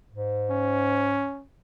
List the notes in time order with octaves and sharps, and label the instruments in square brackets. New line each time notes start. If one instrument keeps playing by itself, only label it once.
[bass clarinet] G#2
[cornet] C#4